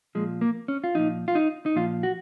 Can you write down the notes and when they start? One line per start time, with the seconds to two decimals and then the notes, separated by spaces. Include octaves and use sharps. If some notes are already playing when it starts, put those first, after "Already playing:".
0.15 A#2 F3 G#3
0.41 A#3
0.68 C#4
0.84 F4
0.95 A#2 F3 D#4
1.28 F4
1.35 D#4
1.66 D#4
1.76 A#2 F3 F4
2.03 F#4